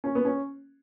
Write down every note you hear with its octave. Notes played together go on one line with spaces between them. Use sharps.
C#4
B3
C#4